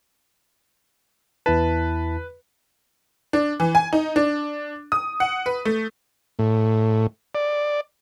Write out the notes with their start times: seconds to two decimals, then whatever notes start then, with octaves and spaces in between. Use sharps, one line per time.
1.46 E2 E4 B4 A5
3.33 D4
3.60 E3
3.75 G#5
3.93 D#4
4.16 D4
4.92 D#6
5.20 F#5
5.46 B4
5.65 A3
6.39 A2
7.35 D5